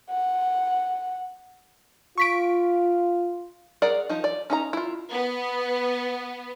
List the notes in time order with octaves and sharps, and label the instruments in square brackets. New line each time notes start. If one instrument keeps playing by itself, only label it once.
[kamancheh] F#5
[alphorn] F4 [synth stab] C#6 B6 D7
[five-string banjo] G#4 A#4 D5 F#5
F3 D#4
D5
C#4 D#4 A#5
E4 F4
[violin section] B3